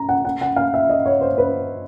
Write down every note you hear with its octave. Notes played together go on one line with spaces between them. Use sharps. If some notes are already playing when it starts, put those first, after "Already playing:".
Already playing: A#5
F#5
F#5
F#5
F5
E5
D#5
C#5
C5
B4